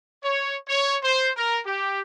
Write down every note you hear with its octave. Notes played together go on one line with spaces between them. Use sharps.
C#5
C#5
C5
A#4
G4